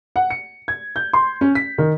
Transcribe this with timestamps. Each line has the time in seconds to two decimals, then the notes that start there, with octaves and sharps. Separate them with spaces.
0.16 F#5
0.30 C#7
0.68 G#6
0.96 G6
1.13 C6
1.41 C#4
1.55 B6
1.78 D#3